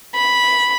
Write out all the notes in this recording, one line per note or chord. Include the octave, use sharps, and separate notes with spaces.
B5